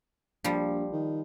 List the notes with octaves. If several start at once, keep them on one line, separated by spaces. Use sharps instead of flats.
A#1 F3 G3
D#3